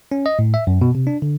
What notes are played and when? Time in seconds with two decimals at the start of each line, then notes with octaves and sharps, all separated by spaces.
0.12 C#4
0.26 D#5
0.39 A2
0.54 E5
0.67 F#2
0.81 B2
0.95 C3
1.07 D4
1.22 D3